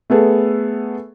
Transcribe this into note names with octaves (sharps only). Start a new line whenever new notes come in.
A3 B3 G#4 A4